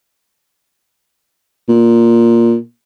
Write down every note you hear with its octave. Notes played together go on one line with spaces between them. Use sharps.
A#2